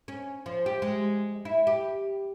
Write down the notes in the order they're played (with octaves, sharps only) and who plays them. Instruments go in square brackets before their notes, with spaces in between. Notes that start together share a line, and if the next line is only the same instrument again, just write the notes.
[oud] C#4
F3
G4
G#3
E4
G4